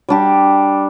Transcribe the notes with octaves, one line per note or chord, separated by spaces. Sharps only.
G3 D4 G4